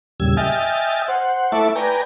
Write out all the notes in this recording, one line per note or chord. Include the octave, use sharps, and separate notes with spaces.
E2 A#2 C#3 G3 E6 G#6
D#5 E5 G5 G#5 F6 A6
C5 F#5
A3 E4 E5 A5 C#6 D6
B4 D5 G5 G#5 A#5